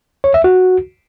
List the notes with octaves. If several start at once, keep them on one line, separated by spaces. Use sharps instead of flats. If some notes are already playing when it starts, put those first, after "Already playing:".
C#5
E5
F#4